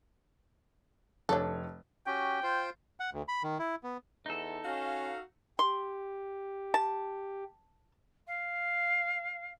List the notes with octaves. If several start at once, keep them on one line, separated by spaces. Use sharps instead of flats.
F1 D4 A4 C#5
C#4 F#4 G4 G5
F4 C5
F#5
D2
B5
D#3
E4
B3
E2 D#4 A4
C#4 F#4 F5
G4 C6
A5
F5